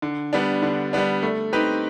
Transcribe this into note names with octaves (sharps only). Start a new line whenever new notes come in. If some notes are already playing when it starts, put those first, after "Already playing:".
D3
G3 B3 D4
D3
G3 B3 D4
A3
C4 D#4 G4 B4